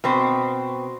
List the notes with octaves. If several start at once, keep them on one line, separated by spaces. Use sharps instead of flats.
B2 C4